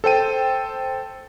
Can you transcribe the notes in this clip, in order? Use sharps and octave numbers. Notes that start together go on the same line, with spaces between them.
A4 C5 G5 D#7